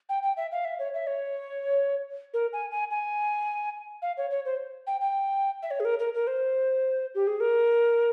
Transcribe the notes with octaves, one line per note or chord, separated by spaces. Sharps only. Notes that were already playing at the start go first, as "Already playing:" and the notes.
G5
G5
E5
F5
E5
C#5
E5
C#5
A#4
G#5
G#5
G#5
F5
C#5
C#5
C5
G5
G5
E5
C#5
G#4
A#4
A#4
A#4
C5
G4
G#4
A#4